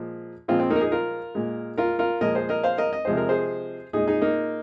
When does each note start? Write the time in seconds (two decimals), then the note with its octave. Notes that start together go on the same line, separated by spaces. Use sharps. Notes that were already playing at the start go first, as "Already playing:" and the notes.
Already playing: A#2 F3 G#3
0.48 A#2 F3 G#3 C4 F4
0.60 C4
0.70 A#3 D#4
0.76 A#4
0.81 D#4 G#4
0.92 F4 A#4
1.35 A#2 G#3
1.77 F4 A#4
1.99 F4 A#4
2.21 A#2 F3 G#3 A#4 D#5
2.35 G#4 C5
2.49 A#4 D#5
2.64 C5 F5
2.78 A#4 D#5
2.93 D#5
3.05 C3 F3 G#3 C5
3.17 A#4
3.29 G#4 C5
3.93 A#2 G#3 D#4 G#4
4.07 D#4 G#4
4.21 A#3 D#4